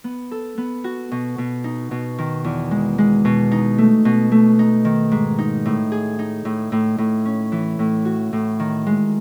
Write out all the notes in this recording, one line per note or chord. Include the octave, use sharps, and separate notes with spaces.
B3
A4
B3
F#4
B2
B2
D#4
B2
D#3
E2
G#3
G#3
B2
D#4
A3
B2
A3
D#4
D#3
G#2
D#4
A2
G#4
D#4
A2
A2
A2
C#4
E3
A2
F#4
A2
D#3
G#3